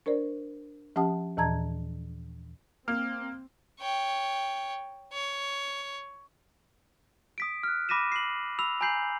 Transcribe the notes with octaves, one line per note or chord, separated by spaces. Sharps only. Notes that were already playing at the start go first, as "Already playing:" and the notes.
D4 A#4 C5 D5
F3 C#4 G4 F#5 A5 D#6
D#2 A#2 E3 A5 A#5 G#6
A#3 C4 F6
C#5 G5
C#5
D#6 B6 D7
F6 F#6
B5 D6 A#6 B6 D#7 E7
C7 F#7
B5 E6 F7
G#5 A#5 B5 G6 C7 F#7